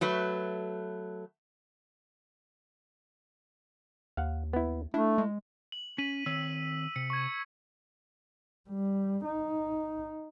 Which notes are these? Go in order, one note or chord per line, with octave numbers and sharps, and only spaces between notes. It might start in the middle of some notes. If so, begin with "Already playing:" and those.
F#3 A3 B4
D#2 F5 F#5
B3 E4
A3 D4 E4
G#3
F#7
C#4 B6 D#7 F#7
D#3 C4 C#5 E6
C3 C#7
C#6 G#6
G3
D#4